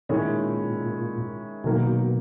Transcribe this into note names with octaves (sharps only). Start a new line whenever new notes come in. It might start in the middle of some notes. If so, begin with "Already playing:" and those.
A#2 D#3 G#3 C#4 E4
B2 D#3 F#3 A#3